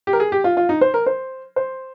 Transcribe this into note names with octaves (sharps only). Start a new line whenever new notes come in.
G4
A#4
G#4
G4
F4
F4
D#4
C5
A#4
C5
C5